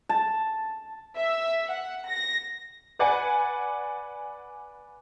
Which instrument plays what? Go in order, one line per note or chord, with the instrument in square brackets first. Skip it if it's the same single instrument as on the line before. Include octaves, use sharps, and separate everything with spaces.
[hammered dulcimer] A5
[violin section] E5
F#5
A#6
[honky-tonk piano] B4 D5 F#5 G#5